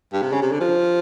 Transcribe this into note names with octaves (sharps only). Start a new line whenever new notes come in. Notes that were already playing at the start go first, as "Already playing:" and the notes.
G2
C3
C#3
C3
D3
F3